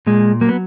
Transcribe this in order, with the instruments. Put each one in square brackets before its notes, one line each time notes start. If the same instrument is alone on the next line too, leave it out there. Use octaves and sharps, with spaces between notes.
[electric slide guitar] A#2 G#3
F#3 A#3
B3